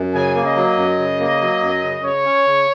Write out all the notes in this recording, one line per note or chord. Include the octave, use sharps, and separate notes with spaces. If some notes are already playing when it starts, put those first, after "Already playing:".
Already playing: F#2
C#3 G#5
A#3
D#5
F#3
F#2
C#3
A#3
F#3
F#2
C#3
C#3 C#5
C#4
C#3